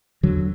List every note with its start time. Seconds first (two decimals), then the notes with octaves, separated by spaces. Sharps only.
0.23 E2 D3 F#3